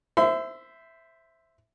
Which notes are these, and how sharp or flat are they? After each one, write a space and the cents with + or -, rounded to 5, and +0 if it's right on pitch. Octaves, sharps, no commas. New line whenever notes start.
C5 +0 E5 +0 C6 -45